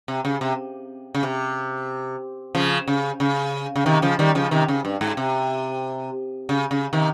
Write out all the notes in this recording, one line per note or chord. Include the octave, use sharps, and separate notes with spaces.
C3
C#3
C3
C#3
C3
C#3 F3
C#3
C#3
C#3
C3 D#3
C#3 F3
D#3 G3
C#3 F3
C3 D#3
C#3
G2
G#2
C3
C#3
C#3
C3 D#3